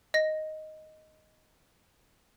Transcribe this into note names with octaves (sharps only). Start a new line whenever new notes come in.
D#5 A#6